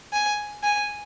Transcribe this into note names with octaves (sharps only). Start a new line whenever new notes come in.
G#5
G#5